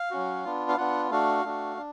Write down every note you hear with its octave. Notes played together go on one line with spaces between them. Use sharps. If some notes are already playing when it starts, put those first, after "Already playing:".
Already playing: F5
F#3 C#4 F#4
B3 D4 F4
F5
B3 D4 F4 F#5
A3 D4 F#4 F5
A3 D4 F#4
D4